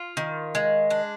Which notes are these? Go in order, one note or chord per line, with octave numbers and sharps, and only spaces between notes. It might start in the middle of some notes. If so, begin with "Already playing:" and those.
Already playing: F4
D#3
G#3
D4